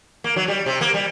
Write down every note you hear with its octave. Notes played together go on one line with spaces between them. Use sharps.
A#3
F#3
G3
C3
A#3
G3